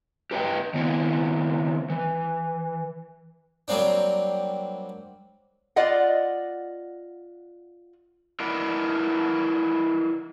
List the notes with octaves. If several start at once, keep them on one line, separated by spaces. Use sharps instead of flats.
G4 B4 D5 D#5 G5
D#3 B3 C4 E4
E3
F#3 G3 A#3 C4 D4
F4 D5 D#5 F#5
E4 A#4 B4 D5 D#5 F#5